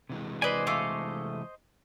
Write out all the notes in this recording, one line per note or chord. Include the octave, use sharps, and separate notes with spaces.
C3 E3 G#3
B4 C5 D5 D#5 G#5
A3 F5 D6